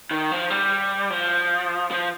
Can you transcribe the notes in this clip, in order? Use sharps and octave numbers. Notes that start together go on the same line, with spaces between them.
D#3
F3
G3
F3
F3